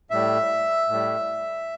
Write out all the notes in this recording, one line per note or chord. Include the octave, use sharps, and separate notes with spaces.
A2 G3 E5
A2 G3